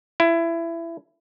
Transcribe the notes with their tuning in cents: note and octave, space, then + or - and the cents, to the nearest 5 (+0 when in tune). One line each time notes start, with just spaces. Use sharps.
E4 +20